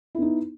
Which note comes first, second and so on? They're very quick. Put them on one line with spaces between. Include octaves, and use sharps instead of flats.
E4 B3 D#4